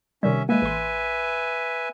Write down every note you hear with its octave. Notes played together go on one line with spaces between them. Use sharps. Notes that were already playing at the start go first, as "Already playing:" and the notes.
C3 D#3 G3 C#4 E5
G#3 A#3 B4 E5 G#5
A1 C6